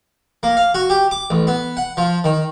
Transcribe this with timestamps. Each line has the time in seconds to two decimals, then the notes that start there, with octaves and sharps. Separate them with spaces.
0.43 A#3
0.57 F5
0.74 F#4
0.90 G4
1.11 D6
1.30 A1
1.47 B3
1.77 F#5
1.97 F3
2.24 D#3